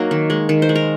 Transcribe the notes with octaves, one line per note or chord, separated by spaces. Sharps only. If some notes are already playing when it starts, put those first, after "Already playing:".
Already playing: F#3 A#3 D#4
D#3
G#3
D#3
C5
G#3
A#4